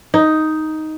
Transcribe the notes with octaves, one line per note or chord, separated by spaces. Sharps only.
D#4